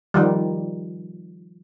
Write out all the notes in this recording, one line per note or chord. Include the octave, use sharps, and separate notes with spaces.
D#3 F3 G3